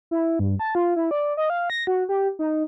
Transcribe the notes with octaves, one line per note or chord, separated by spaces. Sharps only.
E4
G2
A5
F4
E4
D5
D#5
F5
A#6
F#4
G4
D#4